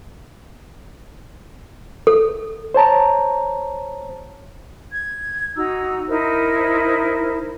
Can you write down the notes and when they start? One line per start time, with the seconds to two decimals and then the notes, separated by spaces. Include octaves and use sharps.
2.07 A4
2.74 C5 C#5 A5 A#5
4.91 G#6
5.56 D#4 F#4 A#5 E6
6.08 D#4 E4 A#4 C5